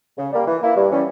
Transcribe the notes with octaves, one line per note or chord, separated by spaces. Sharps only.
C#3
G3 A#3
E3
A#3 E4
G2
E3 G3 C#4